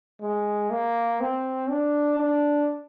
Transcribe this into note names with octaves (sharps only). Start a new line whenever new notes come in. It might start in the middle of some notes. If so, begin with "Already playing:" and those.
G#3
A#3
C4
D4
D4